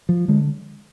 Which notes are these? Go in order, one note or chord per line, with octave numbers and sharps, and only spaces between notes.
F3
D3 G#3